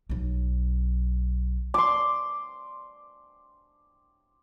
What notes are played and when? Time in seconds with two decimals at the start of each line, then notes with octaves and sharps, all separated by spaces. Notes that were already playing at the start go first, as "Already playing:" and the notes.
0.09 B1 F#3
1.74 C6 D6